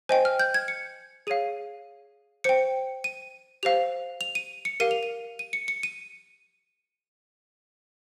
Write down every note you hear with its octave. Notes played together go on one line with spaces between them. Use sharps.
C5 D#5 G5 G#5
F6
G6
G#6
C#7
G#4 C#5 F5 D#7
C5 G5 C#7
D#7
G4 C5 F5 F7
F7
D#7
C#7
G4 A#4 F5 D#7
F7
D#7
D#7
C#7
C#7
D#7